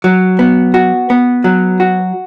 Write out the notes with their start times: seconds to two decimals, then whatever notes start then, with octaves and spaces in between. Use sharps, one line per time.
0.04 F#3
0.39 B3
0.74 F#4
1.10 B3
1.44 F#3
1.80 F#4